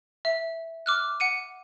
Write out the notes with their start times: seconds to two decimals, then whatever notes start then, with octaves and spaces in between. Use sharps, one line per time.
0.25 E5
0.86 D6 F6 F#6
1.20 F#5 C#7 D#7